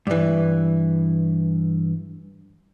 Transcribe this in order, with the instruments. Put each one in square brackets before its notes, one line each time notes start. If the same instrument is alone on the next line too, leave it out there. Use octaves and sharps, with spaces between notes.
[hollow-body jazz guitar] G2 E3